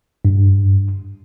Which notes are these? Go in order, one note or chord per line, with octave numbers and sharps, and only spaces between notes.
G2